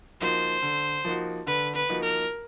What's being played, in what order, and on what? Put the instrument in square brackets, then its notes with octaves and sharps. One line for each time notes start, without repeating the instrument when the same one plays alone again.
[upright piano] F3 A#3 D#4 F#4 [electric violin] C5
[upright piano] D3
F3 A#3 D#4 F#4
[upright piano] D3 [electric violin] B4
[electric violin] B4
[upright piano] F3 A#3 D#4 F#4
[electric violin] A#4